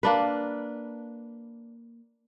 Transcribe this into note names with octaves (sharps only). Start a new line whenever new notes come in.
A#3 D4 B4